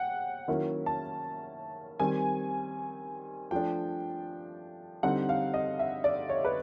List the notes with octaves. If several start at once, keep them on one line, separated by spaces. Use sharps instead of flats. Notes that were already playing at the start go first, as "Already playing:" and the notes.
Already playing: F#5 G5
D#3 F#3 A#3 C#4 E4
A5
D#3 G3 C4 G#5
F3 A3 D4 G5
D3 G3 C4 D#4 F#5
F5
D#5
E5
D5
C#5
B4